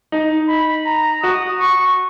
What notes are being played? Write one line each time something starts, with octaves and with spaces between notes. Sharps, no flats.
D#4
B5
A#5
F#4 D#6
C#6